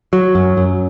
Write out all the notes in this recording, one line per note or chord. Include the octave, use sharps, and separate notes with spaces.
F#3
F#2
F#2